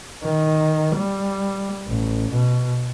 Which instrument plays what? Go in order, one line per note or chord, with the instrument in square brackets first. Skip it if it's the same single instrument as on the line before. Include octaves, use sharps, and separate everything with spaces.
[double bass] D#3
G3
A1
B2